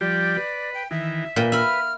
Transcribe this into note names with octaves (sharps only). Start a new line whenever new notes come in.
F3 G3 G4 D5
B4
G5
D#3 E3 E5
A#2 B4 G5
E5 B5 F6